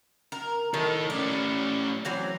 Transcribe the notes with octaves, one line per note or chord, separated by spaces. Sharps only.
A#4
D#3 E4 A4
A2 C#4 D5
E3 F#3 C4